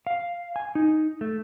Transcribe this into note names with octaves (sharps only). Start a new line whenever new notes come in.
F5
G#5
D#4
A3